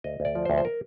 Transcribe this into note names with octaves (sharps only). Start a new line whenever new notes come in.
D2 D#5
D2
D5
F3
C5
D2
C5
A#4